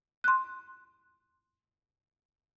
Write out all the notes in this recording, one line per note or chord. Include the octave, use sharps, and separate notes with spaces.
C6 F#6